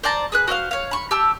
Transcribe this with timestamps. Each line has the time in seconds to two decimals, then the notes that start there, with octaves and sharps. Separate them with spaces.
0.03 C5 D5 A5 A#5
0.32 G#4 B4 F#6
0.48 F#4 C5 D#5 F5
0.71 C#5 F5
0.91 B5 C#6
1.11 G4 A5 E6